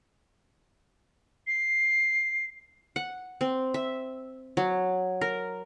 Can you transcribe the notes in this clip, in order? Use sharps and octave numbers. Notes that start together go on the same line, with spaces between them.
C7
F#5
C4
E5
F#3
A#4